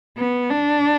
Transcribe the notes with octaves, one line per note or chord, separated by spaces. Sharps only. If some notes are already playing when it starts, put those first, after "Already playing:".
B3
D4